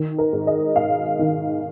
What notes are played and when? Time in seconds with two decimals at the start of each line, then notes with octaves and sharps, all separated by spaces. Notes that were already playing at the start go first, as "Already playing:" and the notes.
Already playing: D#3
0.18 A#4
0.33 G#2
0.47 D#5
0.76 G#2 F5
1.19 D#3